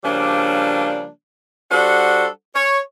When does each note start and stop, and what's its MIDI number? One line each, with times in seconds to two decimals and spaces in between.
0.04 1.09 49
0.04 1.09 53
0.04 1.09 55
0.04 1.09 58
0.04 1.09 62
1.71 2.27 55
1.71 2.27 62
1.71 2.27 66
1.71 2.27 69
1.71 2.27 72
1.71 2.27 78
2.55 2.79 73